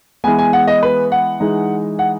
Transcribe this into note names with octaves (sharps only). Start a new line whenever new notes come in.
E3 G#3 B3 G#5
G#5
F#5
D#5
B4
F#5
E3 G#3 D#4
F#5